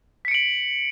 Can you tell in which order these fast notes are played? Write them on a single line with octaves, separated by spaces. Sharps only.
B6 C#7 D7 F#7